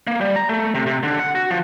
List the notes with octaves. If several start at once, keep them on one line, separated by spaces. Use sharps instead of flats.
A#3
G3
A#5
A3
C3
C3
D3
F#5
F#4
F3